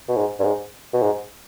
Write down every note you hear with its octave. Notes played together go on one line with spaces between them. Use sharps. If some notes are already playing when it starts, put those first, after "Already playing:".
B2
G#2
G2
G#2
B2
G#2